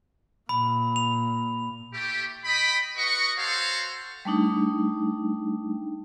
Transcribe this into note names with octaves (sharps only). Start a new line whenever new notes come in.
A#2 B5
F7
A3 E4 G4
D#5 G5 B5
F#4 B4 D#5 C#6
F#4 A4 C5 C#5 F5
G3 A3 D4 D#4